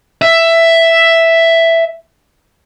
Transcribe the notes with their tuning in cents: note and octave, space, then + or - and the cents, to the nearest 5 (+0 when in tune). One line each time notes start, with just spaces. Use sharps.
E5 +5